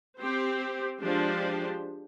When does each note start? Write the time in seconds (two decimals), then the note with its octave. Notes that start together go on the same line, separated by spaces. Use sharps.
0.18 C4 G4 C5
1.00 F3 G#3 D4 G4 C5